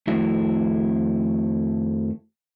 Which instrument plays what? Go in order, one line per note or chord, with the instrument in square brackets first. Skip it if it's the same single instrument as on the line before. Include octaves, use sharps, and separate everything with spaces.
[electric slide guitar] F2 D#3 A3 E4 F#4 E5